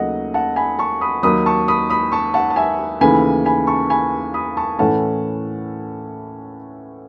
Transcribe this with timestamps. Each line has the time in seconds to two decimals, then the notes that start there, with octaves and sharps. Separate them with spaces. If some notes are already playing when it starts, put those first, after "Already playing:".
Already playing: D#2 C#3 F#3 A3 D#5 F#5
0.34 F#5 A5
0.56 G#5 B5
0.79 A5 C#6
1.01 B5 D#6
1.23 D#2 D#3 F#3 B5 D#6
1.46 A5 C#6
1.68 B5 D#6
1.90 B5 D#6
2.12 A5 C#6
2.34 F#5 A5
2.50 A5
2.56 E5 G#5
3.01 D#2 C#3 E3 A3 G#5 B5
3.45 G#5 B5
3.67 A5 C#6
3.90 G#5 B5
4.34 B5 D#6
4.57 A5 C#6
4.79 A2 E3 A3 C#4 F#5 A5